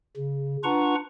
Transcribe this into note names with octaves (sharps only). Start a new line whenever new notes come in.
C#3
D4 F4 B4 F#5 A#5 C#6